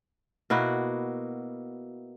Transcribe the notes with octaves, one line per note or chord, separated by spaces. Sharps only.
B2 A#3 E4 F#4